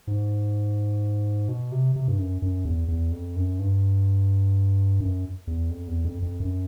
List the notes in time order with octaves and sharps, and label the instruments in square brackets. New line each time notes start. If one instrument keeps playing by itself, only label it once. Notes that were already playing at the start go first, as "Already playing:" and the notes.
[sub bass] G#2
B2
C3
C3
G2
F#2
F#2
E2
E2
F2
F#2
G2
F#2
E2
F2
E2
F2
F2
F#2